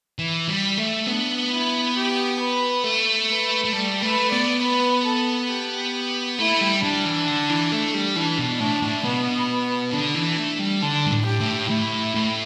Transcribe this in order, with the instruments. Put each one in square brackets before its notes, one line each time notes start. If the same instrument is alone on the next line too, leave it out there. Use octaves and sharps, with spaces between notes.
[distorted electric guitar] E3
G3
A3
[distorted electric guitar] B3 [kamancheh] D4
[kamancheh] E4
G4
B4
[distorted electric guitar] A3
[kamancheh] B4
[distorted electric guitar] A3
[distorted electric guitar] G3 [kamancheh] A4
[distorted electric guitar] A3 [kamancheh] B4
[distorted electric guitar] B3 [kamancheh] D5
[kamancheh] B4
A4
G4
[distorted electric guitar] A3 [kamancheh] E4
[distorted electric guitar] G3
[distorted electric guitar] G3 [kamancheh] D4
[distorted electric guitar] E3
D3
E3
A3
G3
[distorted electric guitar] E3 [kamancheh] D4
[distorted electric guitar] B2
[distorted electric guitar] A2 [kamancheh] D4
[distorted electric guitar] A2
[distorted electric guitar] B2 [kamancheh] B3
[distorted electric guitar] D3 [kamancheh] D4
[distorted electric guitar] E3
A3
G3
[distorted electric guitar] D3 [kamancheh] D4
[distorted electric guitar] G2
A2
[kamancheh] G4
[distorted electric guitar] A2
[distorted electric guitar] A2 [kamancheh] E4
[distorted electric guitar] A2